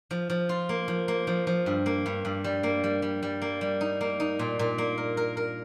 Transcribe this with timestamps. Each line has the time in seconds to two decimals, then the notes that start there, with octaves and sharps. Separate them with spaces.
0.11 F3
0.30 F3
0.49 F4
0.69 A#3
0.88 F3
1.08 A#3
1.27 F3
1.47 F3
1.66 G2
1.86 A#3
2.06 G2
2.25 G2
2.44 G3
2.63 A#3
2.84 G3
3.02 G3
3.23 G3
3.42 A#3
3.61 G3
3.81 D#4
4.01 A#3
4.20 D#4
4.39 A#2
4.59 A#2
4.78 A#3
4.98 A#4
5.17 A#4
5.37 A#4